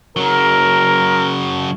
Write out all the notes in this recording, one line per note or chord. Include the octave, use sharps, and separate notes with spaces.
C#3 F#3 A#4